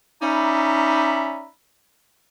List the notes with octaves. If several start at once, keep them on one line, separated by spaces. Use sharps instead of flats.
C#4 D#4 D5 E5 A#5 B5